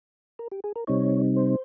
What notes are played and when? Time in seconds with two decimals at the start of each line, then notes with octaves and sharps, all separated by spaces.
0.39 A#4
0.52 G4
0.64 G#4
0.76 A#4
0.87 C3 G3 C4 D#4 C#5
1.36 C5